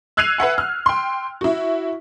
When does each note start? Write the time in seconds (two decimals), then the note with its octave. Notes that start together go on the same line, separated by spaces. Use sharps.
0.17 E6 F#6 G#6 C7 D#7 F7
0.38 B4 E5 F#5 G#5
0.58 F6
0.86 G5 C6
1.41 E4 F#4